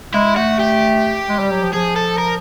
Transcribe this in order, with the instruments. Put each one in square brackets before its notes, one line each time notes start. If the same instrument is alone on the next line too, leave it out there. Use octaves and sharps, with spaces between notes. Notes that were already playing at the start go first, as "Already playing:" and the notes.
[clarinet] G#3 [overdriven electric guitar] E4
[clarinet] A3 [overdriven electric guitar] F#4
[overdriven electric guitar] G4
[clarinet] G#3
G3
F#3
F3
[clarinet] F3 [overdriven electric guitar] G#4
[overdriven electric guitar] A4
A#4